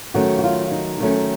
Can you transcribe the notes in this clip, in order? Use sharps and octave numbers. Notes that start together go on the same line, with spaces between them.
D#3 F#3 A3 C#4 F#4
F#4
F4
D#4
D#3 F#3 A3 C#4